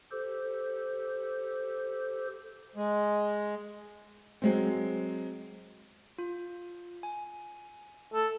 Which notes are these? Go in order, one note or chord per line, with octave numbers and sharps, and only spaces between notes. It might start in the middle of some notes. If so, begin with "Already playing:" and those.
G4 A4 C5
G#3
F#3 G#3 C4
F4
G#5
A4